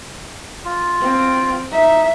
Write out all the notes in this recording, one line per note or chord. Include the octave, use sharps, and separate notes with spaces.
F4
C4
D#4 E5